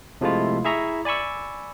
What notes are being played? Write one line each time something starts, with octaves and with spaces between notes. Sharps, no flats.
C3 F3 G#3 A3 E4 F4
E4 G#4 E5 A#5 C#6
D5 G#5 B5 C#6 E6